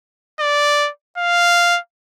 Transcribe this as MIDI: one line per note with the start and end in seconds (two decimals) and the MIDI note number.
0.40 0.90 74
1.18 1.79 77